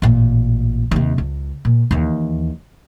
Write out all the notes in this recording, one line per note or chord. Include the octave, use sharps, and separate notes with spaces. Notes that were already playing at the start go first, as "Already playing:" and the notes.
A1 A#2
D#2 C3
C#2
A#2
D#2 E3